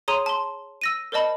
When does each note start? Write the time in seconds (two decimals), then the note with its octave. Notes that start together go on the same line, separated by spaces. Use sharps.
0.08 G#4 C#5 A#5 C6 D#6 D#7
0.26 A5 C6
0.81 E6 A#6 D#7
1.12 A#4 C5 D5 D#5 A5 B5